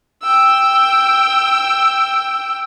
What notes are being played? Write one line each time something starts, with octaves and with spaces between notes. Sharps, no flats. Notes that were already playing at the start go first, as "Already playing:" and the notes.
G5 E6